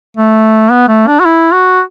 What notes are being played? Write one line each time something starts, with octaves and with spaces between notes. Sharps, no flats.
A3
B3
A3
D4
F#4
E4
F#4